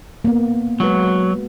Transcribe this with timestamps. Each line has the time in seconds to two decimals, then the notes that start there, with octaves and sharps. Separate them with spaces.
0.25 A#3 B3
0.80 F#3 G#3 F#4 B4